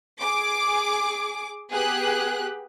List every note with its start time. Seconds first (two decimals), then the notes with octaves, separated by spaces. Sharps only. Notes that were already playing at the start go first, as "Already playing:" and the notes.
0.21 G#4 D6
1.72 B3 G4 G#4 F#6